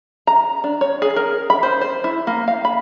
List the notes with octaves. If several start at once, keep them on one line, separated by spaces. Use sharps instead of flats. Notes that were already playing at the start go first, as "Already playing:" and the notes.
A#5
D4
C#5
G#4
A#4
B5
C5
C5
E4
A#3
F5
B5